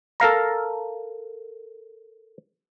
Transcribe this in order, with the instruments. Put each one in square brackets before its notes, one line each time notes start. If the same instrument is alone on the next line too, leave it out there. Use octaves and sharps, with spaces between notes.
[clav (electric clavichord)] A4 A#4 F5 A#5